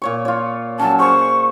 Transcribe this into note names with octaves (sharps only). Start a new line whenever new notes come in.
A#2 C#5 C#6
F4 C#5
F#3 C#4 A5
G#4 C5 C#6